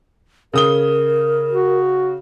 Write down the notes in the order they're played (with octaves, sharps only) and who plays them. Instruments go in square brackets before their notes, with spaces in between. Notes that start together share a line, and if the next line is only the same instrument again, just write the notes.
[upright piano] C#3 D#6 G7 [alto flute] A#4
[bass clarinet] F#4